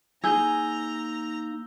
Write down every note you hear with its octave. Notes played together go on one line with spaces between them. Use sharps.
A#3 D#4 G#4 A#5 E6 G6 G7